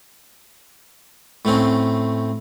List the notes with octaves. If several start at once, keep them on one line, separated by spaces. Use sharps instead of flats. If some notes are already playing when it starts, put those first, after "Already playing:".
A2 A3 C4 C#4